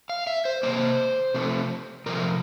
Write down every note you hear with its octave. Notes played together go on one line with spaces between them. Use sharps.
F5
E5
C5
C3 E3 A#3 C5
C3 F3 A3
C3 F3 A3 A#4